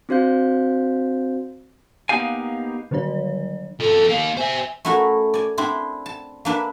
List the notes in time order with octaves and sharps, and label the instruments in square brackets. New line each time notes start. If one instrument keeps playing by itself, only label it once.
[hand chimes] C4 D4 F#4 C5 F5 G6
[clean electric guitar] A#3 B3 D#4 G4 F5 G#5
[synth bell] D3 D#3 F#3 D4 C#5
[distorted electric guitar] F3 D#5 [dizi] A4
[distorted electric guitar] A#3 D#5 [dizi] F5
[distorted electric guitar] C5 E5 [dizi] G#5
[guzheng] A3 C#4 E4 F#4 A4 A#4
D5 G#5
C4 D4 E4 C5
A5
A#3 D4 B4 E5